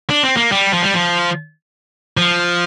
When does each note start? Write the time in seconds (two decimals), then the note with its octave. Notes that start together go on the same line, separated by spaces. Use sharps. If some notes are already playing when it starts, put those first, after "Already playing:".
0.10 D4
0.23 C4
0.37 A#3
0.52 G3
0.73 F3
0.82 G3
0.93 F3
2.17 F3